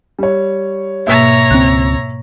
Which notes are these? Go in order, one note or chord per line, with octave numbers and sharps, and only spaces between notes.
G3 C#5
G#2 B2 A#3 C#5 E5 A#5 E6 B6
C#2 C4 F#6 A#6